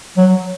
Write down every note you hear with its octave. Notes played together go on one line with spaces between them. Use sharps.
F#3